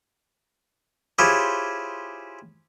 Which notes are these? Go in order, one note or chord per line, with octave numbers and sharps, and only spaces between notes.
E4 F4 G4 G#4 C5 C#5